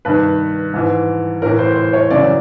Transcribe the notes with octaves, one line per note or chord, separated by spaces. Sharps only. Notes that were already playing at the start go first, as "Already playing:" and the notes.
G2 D#3 B4
G#2 E3
A2 E3 A#4
C5
C5
C#5
F#2 C#3 E3 D5